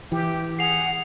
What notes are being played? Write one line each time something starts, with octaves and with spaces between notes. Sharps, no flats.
E3 G4
G#4 F#5 C7 F7